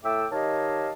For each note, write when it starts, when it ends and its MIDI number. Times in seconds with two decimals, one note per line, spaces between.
0.04 0.26 45
0.04 0.26 69
0.04 0.26 76
0.04 0.26 79
0.04 0.26 86
0.04 0.26 88
0.31 0.91 51
0.31 0.91 67
0.31 0.91 73
0.31 0.91 75
0.31 0.91 77
0.31 0.91 81